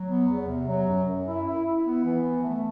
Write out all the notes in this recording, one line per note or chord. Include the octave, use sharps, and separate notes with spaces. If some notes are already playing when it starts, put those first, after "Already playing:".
Already playing: F#3
B3
E2
C3
F#3
F#2
F#2
E4
E4
E4
B3
E3
B3
A3